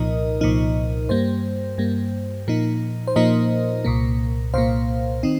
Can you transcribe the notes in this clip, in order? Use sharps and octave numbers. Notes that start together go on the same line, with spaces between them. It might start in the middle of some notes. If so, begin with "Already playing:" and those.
Already playing: C2 A#2 F3 D#4 A#4 D#5
C2 A#2 F3 D#4
G2 G3 A#3 C5
G2 G3 A#3
A#2 F3 A#3 D#4
C5
A#2 F3 A#3 D#4 A#4 D#5
C2 A#2 A#3
C2 A#2 A#3 C5 F5
D#3 C4 D#4